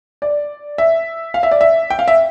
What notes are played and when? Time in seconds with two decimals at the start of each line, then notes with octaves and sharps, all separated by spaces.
0.22 D5
0.78 E5
1.34 F5
1.43 E5
1.51 D5
1.61 E5
1.90 G5
1.99 F5
2.08 E5